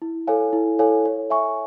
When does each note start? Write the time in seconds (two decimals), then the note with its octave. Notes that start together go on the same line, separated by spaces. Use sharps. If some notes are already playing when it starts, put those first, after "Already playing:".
0.02 E4
0.27 A4 C#5 F5 G#5
0.53 E4
0.79 A4 C#5 F5 G#5
1.05 C#5
1.30 E5 G#5 C#6